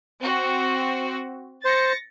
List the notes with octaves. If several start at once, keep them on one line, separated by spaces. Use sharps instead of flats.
C4 F#4
C5 A6 A#6 C#7